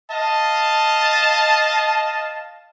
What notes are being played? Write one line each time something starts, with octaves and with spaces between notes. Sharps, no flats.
D#5 F5 A5